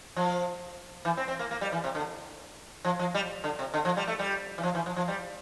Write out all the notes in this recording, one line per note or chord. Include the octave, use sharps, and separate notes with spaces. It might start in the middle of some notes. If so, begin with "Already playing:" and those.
F3
E3
C4
C4
A#3
A#3
G3
E3
C3
D3
F3
F3
G3
D3
C3
D3
F3
G3
A3
G3
E3
F3
E3
F3
F3
G3